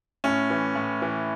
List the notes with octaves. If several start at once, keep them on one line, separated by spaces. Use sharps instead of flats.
A2 C#4
E3
A2
E3